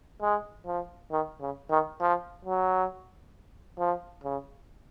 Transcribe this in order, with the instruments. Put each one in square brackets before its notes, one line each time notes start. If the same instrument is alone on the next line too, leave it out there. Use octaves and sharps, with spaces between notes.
[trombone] G#3
F3
D#3
C#3
D#3
F3
F#3
F3
C#3